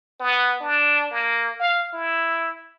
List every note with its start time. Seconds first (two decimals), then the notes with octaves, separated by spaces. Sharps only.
0.20 B3
0.60 D4
1.11 A#3
1.60 F5
1.93 E4